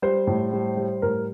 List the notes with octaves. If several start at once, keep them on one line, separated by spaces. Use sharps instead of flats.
G3 C5
A2
G3
G3
A2 A#4